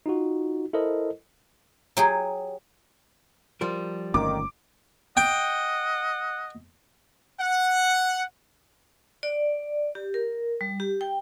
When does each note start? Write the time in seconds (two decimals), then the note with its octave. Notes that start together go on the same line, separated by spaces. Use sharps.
0.06 D#4 F4 F#4
0.73 E4 A4 A#4 C5 D#5
1.97 F#3 G4 G#4
3.61 F3 G3 A#4
4.14 G1 F2 A#2 D#3 A3 C#4 D6
5.17 D#5 F#5 G5
7.40 F#5
9.23 D5
9.95 G4
10.14 A#4
10.61 G3
10.80 G4
11.01 G5